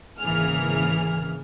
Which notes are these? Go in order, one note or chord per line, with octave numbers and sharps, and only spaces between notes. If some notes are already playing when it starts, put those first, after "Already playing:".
G#1 C#3 E3 A#3 G#4 F6